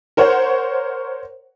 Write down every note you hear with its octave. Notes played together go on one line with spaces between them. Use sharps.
A#4 C5 C#5 F#5